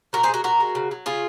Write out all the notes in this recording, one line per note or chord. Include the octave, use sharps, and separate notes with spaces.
A#2 F#4 A#4
G#4 C5
G#3
F#4 A#4
A#2 F#4 A#4
G#3
C#3
F#3
C#3 F4 G#4